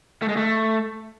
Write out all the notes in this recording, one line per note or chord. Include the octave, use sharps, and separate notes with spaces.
A3
G#3
A3